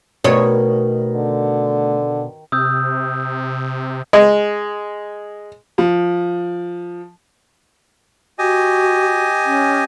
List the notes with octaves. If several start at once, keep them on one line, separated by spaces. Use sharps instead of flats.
B2 D#3 A3 F#4 A#4 C#5
D3
C3 D#6 E6 G6
G#3
F3
F#4 G4 D#5 G#5
C#4